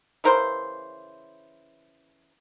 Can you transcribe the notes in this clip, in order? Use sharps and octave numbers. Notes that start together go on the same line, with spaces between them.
C#3 E3 A#4 C5